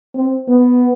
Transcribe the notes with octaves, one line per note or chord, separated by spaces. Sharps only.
C4
B3